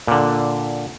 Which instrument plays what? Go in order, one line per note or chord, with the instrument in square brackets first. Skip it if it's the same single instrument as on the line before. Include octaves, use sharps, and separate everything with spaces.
[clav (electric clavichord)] A#2 D3